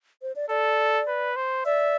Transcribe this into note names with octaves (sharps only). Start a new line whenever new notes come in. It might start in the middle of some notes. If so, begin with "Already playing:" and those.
C5
D5
A4 D5
B4
C5
D5 E5